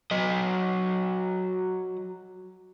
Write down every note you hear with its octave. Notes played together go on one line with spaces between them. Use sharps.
F#3 D#5